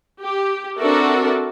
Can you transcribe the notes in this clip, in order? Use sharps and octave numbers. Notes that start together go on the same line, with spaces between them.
G4
C4 D4 F#4 A4 A#4 E5